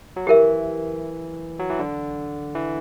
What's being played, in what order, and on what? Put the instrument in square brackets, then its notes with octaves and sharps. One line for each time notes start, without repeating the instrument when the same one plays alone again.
[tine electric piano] F#3
[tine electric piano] E3 [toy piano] G4 A#4 E5
[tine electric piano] F#3
E3
D3
E3